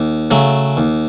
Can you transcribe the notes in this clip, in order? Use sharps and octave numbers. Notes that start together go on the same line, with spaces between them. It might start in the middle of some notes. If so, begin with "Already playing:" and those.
Already playing: D#2
C#3 F#3 A3
D#2